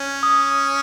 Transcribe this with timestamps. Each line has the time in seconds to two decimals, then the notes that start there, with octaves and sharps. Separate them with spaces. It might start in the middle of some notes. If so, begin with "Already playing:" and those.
Already playing: C#4
0.23 D#6